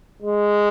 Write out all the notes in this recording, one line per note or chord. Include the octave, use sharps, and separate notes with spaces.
G#3